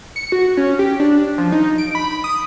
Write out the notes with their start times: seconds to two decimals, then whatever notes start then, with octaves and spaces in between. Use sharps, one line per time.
0.16 C#7
0.32 F#4
0.57 C#4
0.79 G4
1.00 D4
1.38 F3
1.52 D#4
1.78 D7
1.95 B5
2.24 D#6